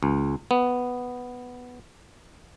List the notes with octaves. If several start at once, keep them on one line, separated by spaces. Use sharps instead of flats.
C#2
B3